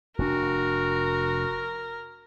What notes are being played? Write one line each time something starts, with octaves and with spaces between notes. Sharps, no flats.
F1 C3 D4 F#4 A#4